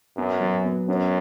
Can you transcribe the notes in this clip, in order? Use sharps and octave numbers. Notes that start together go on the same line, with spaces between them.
F#2 B3
F#3
B3
F#2 C#4